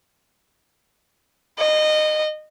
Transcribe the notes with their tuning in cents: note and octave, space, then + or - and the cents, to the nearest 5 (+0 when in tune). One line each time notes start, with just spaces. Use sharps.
D#5 -20